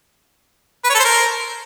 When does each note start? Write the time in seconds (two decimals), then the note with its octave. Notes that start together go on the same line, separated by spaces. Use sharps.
0.84 B4
0.89 C#5
0.94 A4
1.00 C5
1.05 A#4